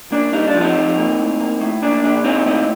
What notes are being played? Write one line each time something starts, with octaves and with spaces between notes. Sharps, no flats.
A#3 D4
G3 D#4
D4
F3
C4 D#4
F3
A#3
A2
A#3
A2
A#3 D4
A#2 D4
A#2 C4 D#4
A2 C4 D#4